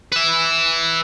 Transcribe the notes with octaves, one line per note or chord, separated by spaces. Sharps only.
B4 E5